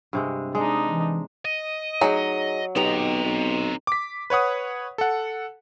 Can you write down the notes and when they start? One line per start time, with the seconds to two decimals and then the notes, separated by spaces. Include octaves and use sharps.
0.13 G2 C3 G#3
0.55 G#3 D4 D#4
0.88 E3
1.45 D#5
2.01 F#3 D#4 G#4
2.76 B1 B3 C4 D#4 G4 A#5
3.25 B1
3.87 D6 B6
4.30 B4 C#5 F#5 D#6
4.98 A4 F#5